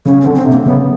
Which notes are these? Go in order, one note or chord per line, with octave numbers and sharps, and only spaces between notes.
C#3 C#4
C4
D3
C4
C3
A#3
C#3 B3